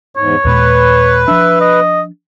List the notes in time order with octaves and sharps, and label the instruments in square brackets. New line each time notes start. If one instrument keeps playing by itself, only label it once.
[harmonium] E2 G#2 [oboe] C#5
[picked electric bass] D#2 A#2 G#3 [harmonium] B4
[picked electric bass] F3 D4 [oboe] E5
[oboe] D#5